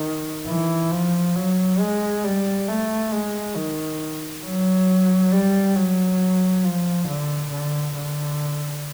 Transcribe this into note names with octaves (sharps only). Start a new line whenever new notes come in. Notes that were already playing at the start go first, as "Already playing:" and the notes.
Already playing: D#3
E3
F3
F#3
G#3
G3
A3
G#3
D#3
F#3
G3
F#3
F3
D3
D3
D3